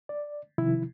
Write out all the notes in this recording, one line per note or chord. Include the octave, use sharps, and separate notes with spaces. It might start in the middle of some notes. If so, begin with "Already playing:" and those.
D5
C3 D#3 F3 E4